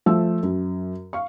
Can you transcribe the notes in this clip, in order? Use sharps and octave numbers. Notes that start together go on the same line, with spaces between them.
F3 A3 E6
F#2
F5 C#6